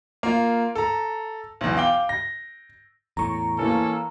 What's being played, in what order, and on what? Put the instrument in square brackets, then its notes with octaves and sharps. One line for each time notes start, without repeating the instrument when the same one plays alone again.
[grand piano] A#3 F4
A4 A#5
B1 E2
F5 G5 D6 G7
A#6
[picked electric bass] E2 A2 [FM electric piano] A#5 C#6
[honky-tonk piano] E3 A#3 [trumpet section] C#4 A4